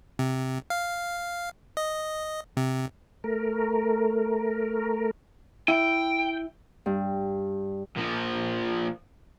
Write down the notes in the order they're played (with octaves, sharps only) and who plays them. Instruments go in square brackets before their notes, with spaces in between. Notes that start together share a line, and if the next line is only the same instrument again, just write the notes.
[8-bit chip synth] C3
F5
D#5
C3
[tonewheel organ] A3 A#4
[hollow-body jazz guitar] E4 [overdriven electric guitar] G5
[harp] G2
[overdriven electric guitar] A#2 F3